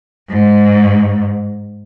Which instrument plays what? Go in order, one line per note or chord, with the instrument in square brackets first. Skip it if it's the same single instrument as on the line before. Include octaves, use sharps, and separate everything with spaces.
[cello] G#2